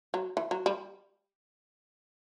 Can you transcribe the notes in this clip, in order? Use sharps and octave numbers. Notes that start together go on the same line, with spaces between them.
F#3
E3
F#3
G3